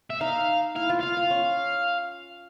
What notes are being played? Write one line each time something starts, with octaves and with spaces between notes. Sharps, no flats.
E5
D#4 F5
E4 F5
F4
F4 F5
F4
C#4